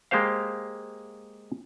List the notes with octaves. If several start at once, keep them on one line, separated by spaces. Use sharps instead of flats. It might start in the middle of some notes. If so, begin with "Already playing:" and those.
G#3 A#3 G4 C5 F5